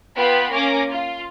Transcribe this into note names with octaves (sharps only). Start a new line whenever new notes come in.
B3 F4 B4 G5 B5
A#3 C#4 A#4 G#5 D6 A#6
F4